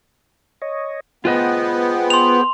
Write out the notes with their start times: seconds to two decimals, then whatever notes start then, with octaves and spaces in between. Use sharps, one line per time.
0.62 C#5 D#5
1.25 B3 F4 G#4 B4 C5 D#5 G5
2.10 C6 F7